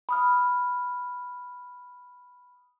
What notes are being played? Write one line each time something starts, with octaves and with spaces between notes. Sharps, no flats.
B5 D#6 F6